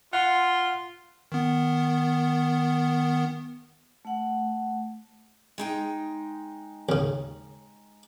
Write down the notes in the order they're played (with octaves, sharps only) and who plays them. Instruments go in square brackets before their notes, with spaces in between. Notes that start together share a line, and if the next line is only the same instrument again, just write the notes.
[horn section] F4 [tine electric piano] F#5 C6
[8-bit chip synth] D#3 B3
[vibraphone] A3 F#5
[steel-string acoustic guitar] G#3 D#4 G5
[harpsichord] D#2 C#3